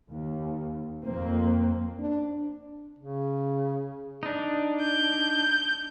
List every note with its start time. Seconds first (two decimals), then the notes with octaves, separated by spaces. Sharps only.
0.10 D#2
1.03 F2 A#3 C4
1.99 D4
2.99 C#3
4.23 D4 D#4
4.81 G6